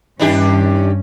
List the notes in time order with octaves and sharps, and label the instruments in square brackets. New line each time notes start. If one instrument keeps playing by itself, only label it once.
[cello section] G2 C#4 [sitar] D#3 D4 G4